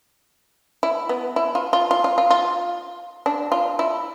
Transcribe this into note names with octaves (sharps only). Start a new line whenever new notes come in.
E4
B3
E4
F4
F4
F4
F4
F4
F4
D4
F4
E4